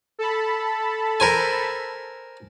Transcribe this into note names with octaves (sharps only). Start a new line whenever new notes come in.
A4 A5 B5
A#4 C5 G#5